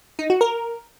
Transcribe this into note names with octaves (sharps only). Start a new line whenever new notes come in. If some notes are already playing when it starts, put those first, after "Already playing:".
D#4
F#4
A#4